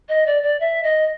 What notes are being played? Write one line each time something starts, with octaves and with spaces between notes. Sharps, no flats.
D#5
D5
D5
E5
D#5